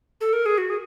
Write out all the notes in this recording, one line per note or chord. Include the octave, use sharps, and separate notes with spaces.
A4
A#4
G#4
F#4
G#4